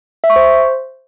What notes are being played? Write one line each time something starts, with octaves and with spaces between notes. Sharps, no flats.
E5
C#6
C5